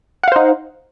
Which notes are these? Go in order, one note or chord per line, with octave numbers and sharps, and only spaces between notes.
D#4 C5 F5 F#5